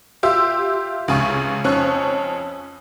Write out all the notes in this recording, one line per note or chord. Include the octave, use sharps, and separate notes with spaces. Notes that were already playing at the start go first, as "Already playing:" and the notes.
F4 G4 E5 C6 E6
C#2 C#3 G#5 C#6
F2 C#4 C#6 F#6